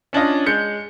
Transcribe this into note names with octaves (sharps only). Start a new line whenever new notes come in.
C#4 D4 F4 D#5
G#3 G6 C#7